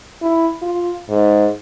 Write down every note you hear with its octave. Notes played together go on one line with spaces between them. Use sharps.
E4
F4
G#2